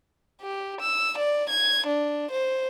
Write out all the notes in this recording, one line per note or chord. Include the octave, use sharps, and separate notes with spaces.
G4
E6
D5
G#6
D4
C5